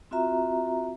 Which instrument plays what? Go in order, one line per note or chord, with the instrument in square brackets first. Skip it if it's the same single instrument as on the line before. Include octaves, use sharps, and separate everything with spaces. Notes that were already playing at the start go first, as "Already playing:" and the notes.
[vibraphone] C4 F4 F#4 E5 A#5